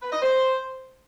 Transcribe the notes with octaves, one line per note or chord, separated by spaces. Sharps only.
B4
D#5
C5